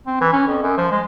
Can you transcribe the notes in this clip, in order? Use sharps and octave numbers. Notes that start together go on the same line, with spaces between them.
C4
E3
C#4
F2
F#2
F3
G#3